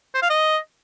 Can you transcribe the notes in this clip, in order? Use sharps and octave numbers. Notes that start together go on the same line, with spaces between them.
C5
F5
D#5